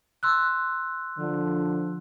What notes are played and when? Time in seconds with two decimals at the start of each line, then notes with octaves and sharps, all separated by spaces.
0.23 C6 E6 F#6
1.18 D3 F3